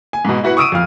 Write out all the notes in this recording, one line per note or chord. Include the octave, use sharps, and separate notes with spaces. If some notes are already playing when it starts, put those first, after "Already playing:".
G#5
G#2 B2
E4 F#4 B4 F#5
C#6 D#6 E6 D7 D#7
F2 F5 F6